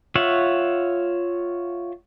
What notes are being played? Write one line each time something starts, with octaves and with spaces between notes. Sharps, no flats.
F4 C#5 E5 F#5